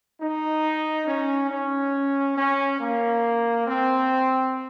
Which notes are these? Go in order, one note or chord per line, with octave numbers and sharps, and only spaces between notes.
D#4
C#4
C#4
C#4
A#3
C4